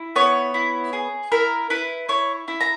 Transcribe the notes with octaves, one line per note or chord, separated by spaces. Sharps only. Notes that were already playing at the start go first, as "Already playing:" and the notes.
Already playing: E4
B3 C#5
E4
G#4
E4 A#4
E4 B4
E4 C#5
E4
A#5